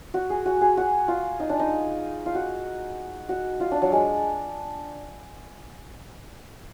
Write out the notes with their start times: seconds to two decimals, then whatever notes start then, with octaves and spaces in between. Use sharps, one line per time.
0.14 F#4
0.30 G#4
0.46 F#4
0.61 G#4
0.77 F#4
1.08 F4
1.40 D#4
1.49 D4
1.59 D#4
2.26 F4
2.35 F#4
3.29 F#4
3.60 F4
3.71 D4
3.82 F#3
3.92 G#3